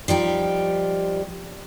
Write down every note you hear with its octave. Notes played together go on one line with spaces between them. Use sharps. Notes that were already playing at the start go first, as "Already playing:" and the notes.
F3 G3 D#4 G4